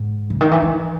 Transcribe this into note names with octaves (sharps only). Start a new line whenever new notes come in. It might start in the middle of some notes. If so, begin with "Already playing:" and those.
Already playing: G#2
C#3
D#3
E3
E3